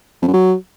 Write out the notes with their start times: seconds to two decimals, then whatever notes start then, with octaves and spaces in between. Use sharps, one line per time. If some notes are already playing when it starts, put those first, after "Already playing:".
0.22 F2
0.28 F#2
0.34 F#3